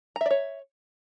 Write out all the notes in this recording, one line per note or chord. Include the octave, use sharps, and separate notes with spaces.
C#5 D5 E5 A#5